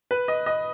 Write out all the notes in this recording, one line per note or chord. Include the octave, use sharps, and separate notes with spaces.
B4
D#5
D#5